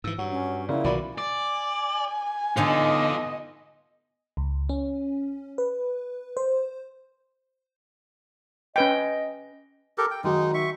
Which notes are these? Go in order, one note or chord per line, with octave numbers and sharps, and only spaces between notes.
G#2 E3 E6
G2 F#3
C#4
A#2 C#3 E4
B1 D#3 E3 F#4 D5 B5
D5 G#5
D3 B3 D#4 F4 A4 C#5 D#5
C#2
C#4
B4
C5
C#4 B4 D#5 G5
G4 A4 A#4
G5
D#3 F#3 G#3 D#4 F#4
E5 C#6